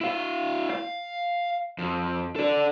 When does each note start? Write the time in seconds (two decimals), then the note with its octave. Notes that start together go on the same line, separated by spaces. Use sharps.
0.01 E4 F5
0.70 F5
1.78 F2
2.36 A4 D5